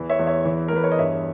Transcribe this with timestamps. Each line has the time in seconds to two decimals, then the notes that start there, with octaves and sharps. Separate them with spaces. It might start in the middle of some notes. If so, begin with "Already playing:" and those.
Already playing: E2 E3
0.10 C#5 E5
0.19 E2
0.27 C#5 E5
0.45 E3
0.68 A#4
0.72 E2 B4
0.84 C#5
0.92 D#5
0.99 G2 C#5 E5